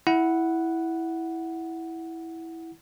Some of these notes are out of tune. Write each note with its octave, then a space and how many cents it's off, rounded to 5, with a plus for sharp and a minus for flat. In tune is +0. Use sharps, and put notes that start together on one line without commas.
E4 -5 F#5 +0